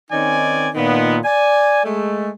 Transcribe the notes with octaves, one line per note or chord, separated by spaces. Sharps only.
D#3 C4 C#4 D#4 D5 G#5
A#2 D#3 B3
D5 G#5
G#3 A3